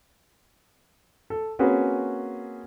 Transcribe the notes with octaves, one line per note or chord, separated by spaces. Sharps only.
A4
A#3 C4 C#4 F#4 G#4 B4